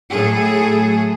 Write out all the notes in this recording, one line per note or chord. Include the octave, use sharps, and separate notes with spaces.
A2 F#3 G#4 A4